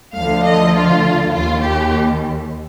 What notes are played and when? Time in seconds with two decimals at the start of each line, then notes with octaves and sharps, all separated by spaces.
0.16 D2 D3 F3 F5
0.44 D#5
0.74 F4
1.32 D#2 D#3 F4
1.62 G4